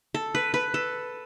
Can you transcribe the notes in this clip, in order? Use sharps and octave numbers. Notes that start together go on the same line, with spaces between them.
A4
B4
B4
A4